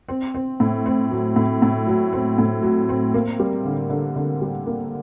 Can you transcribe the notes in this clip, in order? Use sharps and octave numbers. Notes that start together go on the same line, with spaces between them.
C4
C4
A2
C4
F#3
A2
A2
F#3
C4
A2
F#3
C4
A#3
G3
D3
D3
D3
G3
A#3